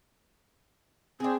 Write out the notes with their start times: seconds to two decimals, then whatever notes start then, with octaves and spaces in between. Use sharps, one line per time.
1.20 C4 D4 G#4